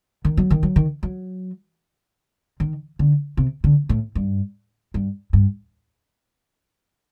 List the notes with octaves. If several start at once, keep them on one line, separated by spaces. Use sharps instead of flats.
D#3
F#3
D#3
F#3
D#3
F#3
D#3
D3
C3
D3
A2
G2
G2
G2